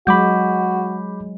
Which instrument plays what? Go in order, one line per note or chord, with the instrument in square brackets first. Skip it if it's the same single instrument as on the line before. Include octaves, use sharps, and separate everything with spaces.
[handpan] F#3 G#3 [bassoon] F#4 [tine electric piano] B5 D6 G6